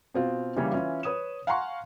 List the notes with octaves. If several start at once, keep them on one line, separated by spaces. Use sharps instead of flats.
B2 C4 F4
C#3 E3 G3 A#3 C#4
E3 C#4 F4
B4 C#5 D#6 E7
F5 F#5 G#5 A#5 C6 C#6